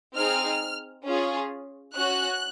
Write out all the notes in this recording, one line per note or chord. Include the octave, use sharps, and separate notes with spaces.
C4 D#4 G#4 F6
C#4 F4 G#4
C#4 F#4 F#6